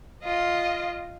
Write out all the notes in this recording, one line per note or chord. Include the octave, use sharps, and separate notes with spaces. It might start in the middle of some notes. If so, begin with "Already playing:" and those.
F4 D#5